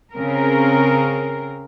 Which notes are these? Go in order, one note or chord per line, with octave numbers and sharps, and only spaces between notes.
C#3 C4 A#4